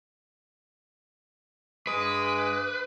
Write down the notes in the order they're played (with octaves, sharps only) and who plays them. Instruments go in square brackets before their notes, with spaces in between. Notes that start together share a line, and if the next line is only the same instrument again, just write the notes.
[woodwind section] G2 D6 D#6 [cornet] G#3 [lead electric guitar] B4